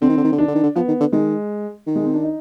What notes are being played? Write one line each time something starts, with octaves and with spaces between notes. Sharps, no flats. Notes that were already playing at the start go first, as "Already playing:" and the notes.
D3 C4
D#3
D3
D#3
D3
D#3 D4
D3
D#3
D3
F3 B3
D#3
D3
D#3 G#3
D#3
G#3
C4
D4
D#4